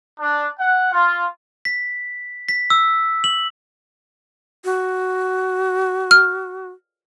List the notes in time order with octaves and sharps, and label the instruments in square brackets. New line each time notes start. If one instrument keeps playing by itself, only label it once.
[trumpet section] D4
F#5
F4
[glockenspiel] B6
B6
E6
F#7
[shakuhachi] F#4
[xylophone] F6